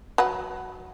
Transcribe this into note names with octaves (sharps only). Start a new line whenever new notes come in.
F#3 B4 F#5